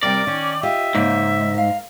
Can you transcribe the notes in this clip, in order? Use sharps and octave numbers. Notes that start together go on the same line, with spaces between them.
C3 G3 C4 A#4 D5
D#3 C#4
F4 G4 D#5 E5
G#2 C#3 A#3 D#4
A#4 F5